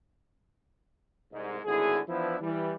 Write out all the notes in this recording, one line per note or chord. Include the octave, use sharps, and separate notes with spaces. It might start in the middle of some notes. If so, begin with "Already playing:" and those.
C2 G#2
G#1 A2 D3 E4 F#4 G#4
E3 F3 B3 D4 E4
E3 G3